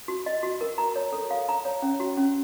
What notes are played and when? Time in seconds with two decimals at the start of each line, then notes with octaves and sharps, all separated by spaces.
0.08 F#4
0.26 D#5
0.43 F#4
0.61 A#4
0.78 A#5
0.96 C#5
1.13 A4
1.31 F5
1.49 A#5
1.65 C#5
1.82 C#4
2.00 F#4
2.17 C#4